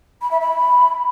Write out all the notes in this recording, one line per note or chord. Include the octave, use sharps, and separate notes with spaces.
B5
E5
B5